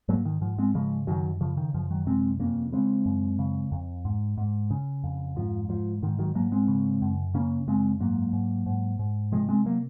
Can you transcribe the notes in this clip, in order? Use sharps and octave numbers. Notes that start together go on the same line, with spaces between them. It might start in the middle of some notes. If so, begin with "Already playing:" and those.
G#2 F#3 A#3
D#3
G#2 F3
G#3 C4
C#3 F3 G#3
F#2 D#3 F#3
C#3 F3
D#3
F#2 F3
D#3 F#3
C3 G#3 C4
F2 A#3 C#4
C#3 G#3 C4
F#2
C#3
F2
G#2
G#2
C#3
F2
G#2 F3
G#2 F3
G#2 D#3
D#3 F#3
G#2 F#3 A#3
G#3 C4
C#3
F#2
C#3 A#3 C#4
F#2 G#3 C4
G#2 F#3 A#3
G#2
G#2
G#2
C3 F3 G#3
G#3 C4
F#3 A#3